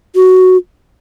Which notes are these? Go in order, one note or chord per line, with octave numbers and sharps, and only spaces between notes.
F#4